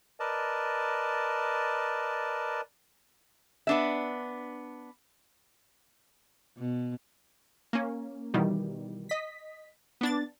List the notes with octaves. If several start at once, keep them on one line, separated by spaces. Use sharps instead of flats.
A#4 B4 D5 D#5 A5
B3 D4 E5
B2
A#3 C#4
B2 D#3 E3 G3
D#5 B6
B3 D4 A6